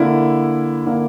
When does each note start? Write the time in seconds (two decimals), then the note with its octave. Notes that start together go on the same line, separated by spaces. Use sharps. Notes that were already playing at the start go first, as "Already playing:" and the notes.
Already playing: D3 A#3 E4
0.86 D3 A#3